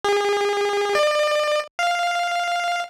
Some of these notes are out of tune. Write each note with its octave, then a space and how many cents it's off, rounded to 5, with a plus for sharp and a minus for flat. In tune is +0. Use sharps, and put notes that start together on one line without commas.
G#4 -35
D5 +35
F5 +0